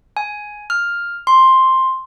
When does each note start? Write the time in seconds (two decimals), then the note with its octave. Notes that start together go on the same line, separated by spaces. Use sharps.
0.17 G#5
0.70 F6
1.27 C6